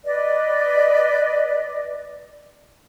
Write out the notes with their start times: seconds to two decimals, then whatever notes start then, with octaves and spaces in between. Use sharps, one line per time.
0.05 B4 D5 D#5